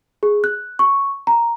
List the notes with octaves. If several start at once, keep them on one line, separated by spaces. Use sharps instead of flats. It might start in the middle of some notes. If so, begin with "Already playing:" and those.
G#4
F#6
C#6
A#5